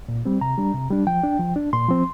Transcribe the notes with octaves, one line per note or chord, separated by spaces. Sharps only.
A#2
G3 C4
C3 A#5
G3 D4
C3
G3 D4
F3 G5
D4
F3
D4
A#2 C6
F3 C4